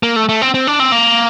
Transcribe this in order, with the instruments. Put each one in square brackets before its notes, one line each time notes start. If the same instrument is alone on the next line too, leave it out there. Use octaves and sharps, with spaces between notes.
[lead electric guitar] A#3
A3
A3
C4
C4
D4
C4
A#3